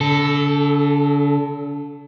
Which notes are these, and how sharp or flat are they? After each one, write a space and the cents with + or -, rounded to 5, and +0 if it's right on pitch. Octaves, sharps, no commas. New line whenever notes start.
D3 -40 A4 +0